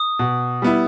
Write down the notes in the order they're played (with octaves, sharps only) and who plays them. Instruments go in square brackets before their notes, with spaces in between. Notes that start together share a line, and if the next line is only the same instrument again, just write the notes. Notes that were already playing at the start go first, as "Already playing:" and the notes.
Already playing: [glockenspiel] D#6
[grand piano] B2
G3 B3 E4